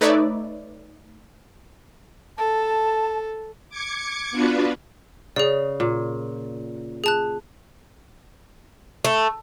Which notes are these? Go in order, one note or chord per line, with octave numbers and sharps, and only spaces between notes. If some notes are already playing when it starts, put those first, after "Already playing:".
A3 D#4 B4 C#5 D5 E5
A4 A5
D6 G#6 C#7
B3 D4 F4 F#4 B4
C#3 G#4 D5
A#2
G#4 A5 F#6
A3